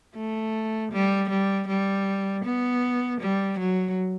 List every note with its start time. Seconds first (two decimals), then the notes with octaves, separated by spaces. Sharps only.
0.15 A3
0.92 G3
1.29 G3
1.67 G3
2.44 B3
3.21 G3
3.59 F#3